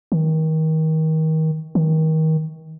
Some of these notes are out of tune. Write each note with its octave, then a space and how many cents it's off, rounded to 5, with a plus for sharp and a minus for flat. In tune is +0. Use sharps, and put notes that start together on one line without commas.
D#3 +30
D#3 +30